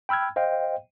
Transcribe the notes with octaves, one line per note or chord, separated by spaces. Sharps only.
G5 B5 E6 F6 G#6
C5 D#5 F5 G5